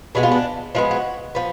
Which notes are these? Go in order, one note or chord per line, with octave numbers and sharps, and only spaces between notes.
B2 G#3 B3 D4
F4
D4
F3 G#3 B3 F4
F#4
F3 B3